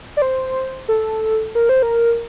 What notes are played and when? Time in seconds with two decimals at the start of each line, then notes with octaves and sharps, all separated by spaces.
0.17 D5
0.22 C5
0.89 A4
1.55 A#4
1.69 C5
1.82 A#4